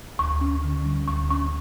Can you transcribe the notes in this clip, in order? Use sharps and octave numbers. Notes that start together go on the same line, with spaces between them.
D2 C#6
C#4
D3
G3
D2 C#6
C#4 C#6